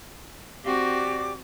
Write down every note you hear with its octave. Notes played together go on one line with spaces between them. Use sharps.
C4 F#4 G4 D5 D6